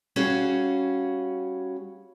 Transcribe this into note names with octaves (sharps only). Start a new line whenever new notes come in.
G3 C#4 F#4 G#4 F5